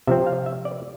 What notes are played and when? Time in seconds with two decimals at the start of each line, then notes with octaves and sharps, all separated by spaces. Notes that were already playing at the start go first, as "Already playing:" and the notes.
0.07 C3 F3 C4 E5
0.27 F5
0.46 E5
0.65 D5